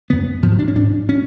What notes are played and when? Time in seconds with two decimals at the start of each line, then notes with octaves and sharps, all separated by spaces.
0.10 F#2 C#3 B3
0.43 G#2 F3
0.52 F#3
0.59 D4
0.68 C#4
0.75 G#2 D4
1.09 C#4